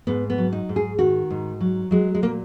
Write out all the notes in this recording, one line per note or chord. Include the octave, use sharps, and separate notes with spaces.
G#2 B3
B3
F#3
D#4
G#2
G#4
D#3 F#4
G#2
F#3
F#3 G#3
G#3
A#2 A#3